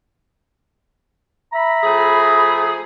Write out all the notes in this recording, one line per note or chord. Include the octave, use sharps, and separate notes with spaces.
E5 A#5 B5
F3 A3 G#4